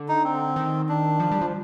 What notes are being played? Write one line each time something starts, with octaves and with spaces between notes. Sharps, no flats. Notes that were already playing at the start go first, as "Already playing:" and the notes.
Already playing: D3
D#4
C4
D#3
D4
F3
G3
F3